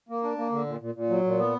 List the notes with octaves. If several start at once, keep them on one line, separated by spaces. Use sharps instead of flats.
A#3
D4
A#3
D3
A#2
A#2
A#2
F#3
A#2
B3